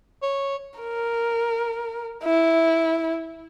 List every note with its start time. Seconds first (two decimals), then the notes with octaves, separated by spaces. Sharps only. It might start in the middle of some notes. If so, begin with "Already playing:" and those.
0.23 C#5
0.79 A#4
2.23 E4